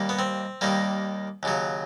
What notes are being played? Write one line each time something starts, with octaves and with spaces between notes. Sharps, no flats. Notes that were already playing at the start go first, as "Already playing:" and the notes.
Already playing: D#2 D#3 G3 A#3
B3
C4
D#2 D#3 G3 A#3
D#2 C#3 F#3